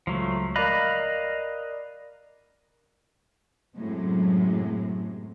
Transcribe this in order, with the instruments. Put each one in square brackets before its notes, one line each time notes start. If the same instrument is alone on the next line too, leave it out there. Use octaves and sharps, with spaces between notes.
[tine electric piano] C#2 [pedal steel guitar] F3 F#3 A3
[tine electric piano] A#4 D5 F#6 [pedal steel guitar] D#5 F5 B5
[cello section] F#2 A2 C3 F#3 G#3